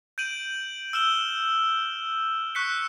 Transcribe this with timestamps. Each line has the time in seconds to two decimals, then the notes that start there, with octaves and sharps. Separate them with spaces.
0.18 G6 D7 D#7 F#7
0.93 E6 F6 E7 G7
2.55 C#6 F#6 B6 C#7